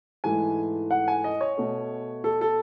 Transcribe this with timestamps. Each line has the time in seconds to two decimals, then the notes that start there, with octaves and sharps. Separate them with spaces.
0.24 G#2 E3 A3 G#5
0.91 F#5
1.08 G#5
1.24 D#5
1.41 C#5
1.57 B2 A3
2.24 A4
2.41 A4